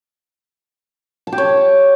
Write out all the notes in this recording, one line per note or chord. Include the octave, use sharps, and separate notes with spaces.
A5
G4
C#5